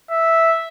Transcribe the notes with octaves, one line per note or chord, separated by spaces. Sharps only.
E5